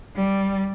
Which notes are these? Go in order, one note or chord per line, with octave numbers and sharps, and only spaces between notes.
G3